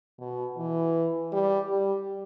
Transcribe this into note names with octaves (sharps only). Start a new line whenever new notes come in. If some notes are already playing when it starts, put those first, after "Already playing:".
B2
E3
G3
G3